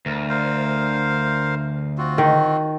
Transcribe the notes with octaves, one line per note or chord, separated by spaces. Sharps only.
D2 A#4
A#4 C5 F5
C4 F4 F#4
D#3